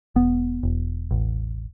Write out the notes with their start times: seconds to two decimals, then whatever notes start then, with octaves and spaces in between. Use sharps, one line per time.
0.16 E1 B3
0.63 E1
1.11 A1